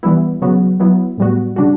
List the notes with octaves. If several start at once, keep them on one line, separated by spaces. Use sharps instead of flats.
E3 G3 B3 E4
C#3 F#3 B3 F#4
F#3 B3 E4
A2 G3 B3 F#4
C#3 G3 D4 F#4